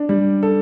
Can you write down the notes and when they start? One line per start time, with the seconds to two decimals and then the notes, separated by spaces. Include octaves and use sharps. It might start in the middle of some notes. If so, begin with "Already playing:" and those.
Already playing: D4
0.09 G3
0.43 A4